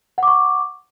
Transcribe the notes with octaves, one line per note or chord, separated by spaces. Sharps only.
F#5 C#6 D6